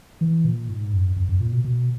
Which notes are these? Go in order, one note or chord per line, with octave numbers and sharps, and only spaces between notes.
E3
A#2
G#2
F#2
F#2
F#2
A#2
B2
B2